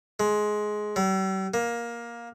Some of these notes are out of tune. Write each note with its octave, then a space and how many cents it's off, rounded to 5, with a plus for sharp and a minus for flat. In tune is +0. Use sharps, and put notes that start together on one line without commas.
G#3 +15
G3 -45
A#3 +15